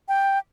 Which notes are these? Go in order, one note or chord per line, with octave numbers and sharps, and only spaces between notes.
G5